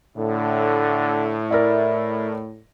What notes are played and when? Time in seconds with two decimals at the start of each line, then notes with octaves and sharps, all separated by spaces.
0.17 A2 D3
1.51 E4 A#4 D5 E5